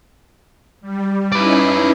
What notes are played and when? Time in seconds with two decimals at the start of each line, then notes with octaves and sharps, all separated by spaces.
0.81 G3
1.32 C#4 D#4 E4 B4 D5